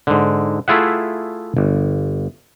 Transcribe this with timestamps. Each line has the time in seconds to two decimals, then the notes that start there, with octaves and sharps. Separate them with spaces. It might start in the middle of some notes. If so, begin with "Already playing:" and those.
0.07 G#2 D3
0.68 A3 E4 F4 G#4 E5 F#5
1.57 G1